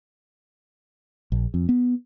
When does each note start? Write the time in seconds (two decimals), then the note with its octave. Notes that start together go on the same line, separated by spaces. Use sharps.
1.32 A#1
1.54 F2
1.69 B3